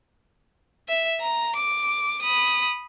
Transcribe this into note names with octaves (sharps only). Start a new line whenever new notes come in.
E5
A#5
D6
B5 D#6